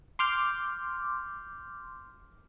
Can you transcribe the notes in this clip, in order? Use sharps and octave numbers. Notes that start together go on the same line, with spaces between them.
C6 D6 F6 G6